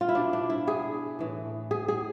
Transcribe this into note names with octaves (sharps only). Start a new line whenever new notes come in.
F4
E4
B2 D4
D4
E4
G#4
A2 E3
G#4
G#4